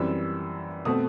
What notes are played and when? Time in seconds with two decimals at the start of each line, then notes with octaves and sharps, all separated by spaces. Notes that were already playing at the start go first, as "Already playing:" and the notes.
Already playing: F#2 E3 G3 C4 E6
0.85 B2 A3 C4 D#6